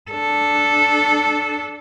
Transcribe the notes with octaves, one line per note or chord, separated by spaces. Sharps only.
D4 A4